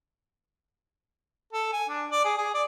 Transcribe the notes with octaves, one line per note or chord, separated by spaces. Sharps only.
A4
G#5
D4
D5
G#4
G#4
D5